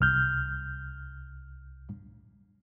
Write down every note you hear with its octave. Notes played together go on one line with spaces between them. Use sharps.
C2 F6 G6